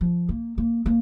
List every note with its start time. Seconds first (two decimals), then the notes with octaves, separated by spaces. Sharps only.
0.01 F3
0.29 A#3
0.58 A#3
0.86 A#3